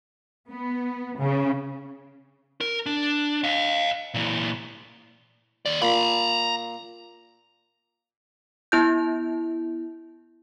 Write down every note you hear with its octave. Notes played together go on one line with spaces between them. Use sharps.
B3
C#3
A#4
D4
D#5 F5
A#2 E3
D#2 D5
A#2 A#5 B5
B3 E4 G6